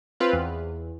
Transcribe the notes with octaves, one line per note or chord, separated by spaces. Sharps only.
C4 F4 B4 F5
E2